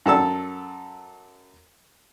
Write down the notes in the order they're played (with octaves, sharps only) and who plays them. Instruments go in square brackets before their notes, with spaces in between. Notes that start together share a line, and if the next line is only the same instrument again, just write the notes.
[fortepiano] F#2 A4 A5 E6